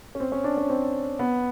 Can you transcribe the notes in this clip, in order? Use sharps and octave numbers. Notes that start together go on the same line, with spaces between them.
C#4
C4
C#4
D4
C#4
C4
B3